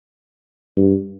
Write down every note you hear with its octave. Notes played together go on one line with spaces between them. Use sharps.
G2